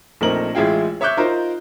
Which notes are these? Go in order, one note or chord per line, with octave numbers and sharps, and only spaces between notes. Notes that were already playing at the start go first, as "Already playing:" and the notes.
A#1 A3 C4 D#4 A#4 F#7
A1 G#3 E4 F4 G#4 G5
C#5 E5 C#6 D6 F#6 G6
D#4 F4 A#4 C5